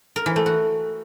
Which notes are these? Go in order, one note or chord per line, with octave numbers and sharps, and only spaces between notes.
A#4
E3
A3
F#4